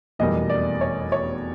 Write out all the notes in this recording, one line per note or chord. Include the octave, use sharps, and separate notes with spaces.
F1 E2 B2 G3 A#3 D#5
D5
C#5
C#5